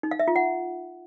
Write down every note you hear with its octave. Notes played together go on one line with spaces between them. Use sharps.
D#4
F5
E5
F4
F#5